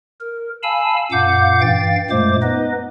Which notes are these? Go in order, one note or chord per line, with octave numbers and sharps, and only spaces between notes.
A#4
F5 G#5 A5 B5 E6
F#2 A#2 F5 F#5 D6 G6
G2 E3 F5 G5 A6
F#2 A#2 G#3 A3 C5 D6
B3 D#4 B4 D#5